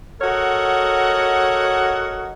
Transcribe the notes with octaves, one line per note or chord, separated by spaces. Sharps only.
F#4 A4 A#4 C#5 D#5 F#5